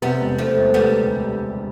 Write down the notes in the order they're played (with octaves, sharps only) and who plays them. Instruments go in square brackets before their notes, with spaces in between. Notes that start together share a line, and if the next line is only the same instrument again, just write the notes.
[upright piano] C3 [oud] G3 B3
[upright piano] E1
[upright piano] E1 [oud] F3 A3
[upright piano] E1
[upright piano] D2 [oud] G3 B3